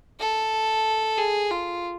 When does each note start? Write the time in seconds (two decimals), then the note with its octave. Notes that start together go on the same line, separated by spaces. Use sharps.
0.20 A4
1.18 G#4
1.51 F4